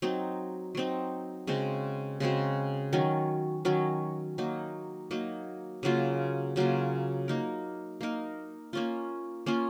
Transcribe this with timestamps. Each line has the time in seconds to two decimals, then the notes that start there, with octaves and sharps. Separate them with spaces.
0.02 F#3 C4 D#4
0.75 F#3 C4 D#4
1.47 C#3 G#3 C4 F#4
2.20 C#3 G#3 C4 F#4
2.93 D#3 F#3 C#4
3.65 D#3 F#3 C#4
4.38 F#3 A#3 D#4
5.11 F#3 A#3 D#4
5.83 C#3 F#3 A#3 F4
6.56 C#3 F#3 A#3 F4
7.28 A#3 D#4 A#4
8.01 A#3 D#4 A#4
8.73 A#3 C#4 F4
9.46 A#3 C#4 F4